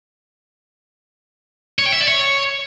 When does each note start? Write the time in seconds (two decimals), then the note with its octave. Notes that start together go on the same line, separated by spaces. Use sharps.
1.79 C#5
1.86 G5
1.93 E5
2.01 D5
2.08 C#5